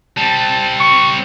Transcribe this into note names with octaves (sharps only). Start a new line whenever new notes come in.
G3 C4 A5
C#6